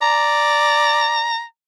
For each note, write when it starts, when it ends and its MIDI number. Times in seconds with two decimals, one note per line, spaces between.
0.02 1.30 74
0.02 1.43 82